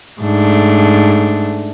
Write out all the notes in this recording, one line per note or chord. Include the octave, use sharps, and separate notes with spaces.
G#2 A3 D4